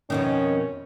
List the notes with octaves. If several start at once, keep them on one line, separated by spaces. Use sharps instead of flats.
F2 B2 D#3 C#4